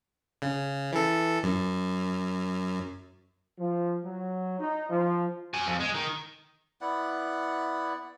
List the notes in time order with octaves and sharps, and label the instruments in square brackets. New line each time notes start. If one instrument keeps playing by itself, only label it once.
[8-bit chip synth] C#3
E3 A4
F#2
[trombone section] F3
F#3
D#4
F3
[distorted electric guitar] F#4 G#5
F2
G#3
D#3
[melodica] B3 E4 D5 F#5